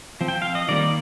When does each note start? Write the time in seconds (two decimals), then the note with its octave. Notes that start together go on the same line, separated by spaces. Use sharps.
0.21 F3 C4
0.28 G5
0.42 F5
0.55 D#5
0.69 D#3 G3 A#3 D5